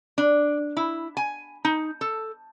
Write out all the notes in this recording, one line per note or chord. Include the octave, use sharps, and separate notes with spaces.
D4
E4
G#5
D#4
A4